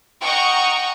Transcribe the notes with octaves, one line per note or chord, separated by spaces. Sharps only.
D#5 F#5 G5 A#5 C#6